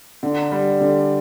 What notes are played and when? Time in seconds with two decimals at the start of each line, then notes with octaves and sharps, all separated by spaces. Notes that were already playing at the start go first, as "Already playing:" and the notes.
0.23 D3
0.52 G3
0.81 D3